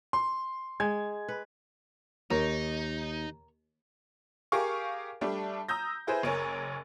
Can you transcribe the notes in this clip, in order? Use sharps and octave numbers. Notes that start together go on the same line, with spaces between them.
C6
G#3 G#6
B4
D#2 D#4 A#4 C#5
G4 G#4 A#4 F5 C#6
G3 A3 D4
A#5 D#6 E6 G6 A#6
E4 G#4 B4 C5
F#1 A#4 C#5 G#5